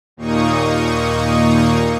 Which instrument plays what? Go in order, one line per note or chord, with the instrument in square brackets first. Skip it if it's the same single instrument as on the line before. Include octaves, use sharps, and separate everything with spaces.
[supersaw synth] D#2 A#2 A#3 D#4 C#6 D#6